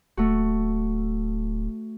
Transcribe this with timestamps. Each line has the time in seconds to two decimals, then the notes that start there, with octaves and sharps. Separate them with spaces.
0.17 D1 A3 F#4